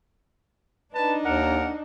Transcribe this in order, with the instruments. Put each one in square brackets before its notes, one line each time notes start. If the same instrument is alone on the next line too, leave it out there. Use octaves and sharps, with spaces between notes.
[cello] D4 D#4 [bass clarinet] B4 [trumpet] A5
[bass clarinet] D#2 [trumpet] A#4 [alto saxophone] F#5